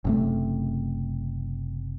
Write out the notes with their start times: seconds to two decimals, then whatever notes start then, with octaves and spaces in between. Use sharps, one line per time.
0.05 F#1 C3 A3